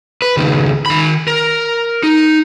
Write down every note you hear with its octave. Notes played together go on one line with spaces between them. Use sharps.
B4
C#2 D#3
D#3 B5
A#4
D#4